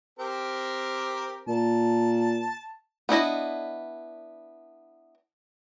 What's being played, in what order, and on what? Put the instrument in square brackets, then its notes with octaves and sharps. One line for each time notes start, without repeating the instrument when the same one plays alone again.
[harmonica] C4 G4 A#4
[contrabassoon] A#2 [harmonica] A5
[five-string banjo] B3 D4 E4 D#5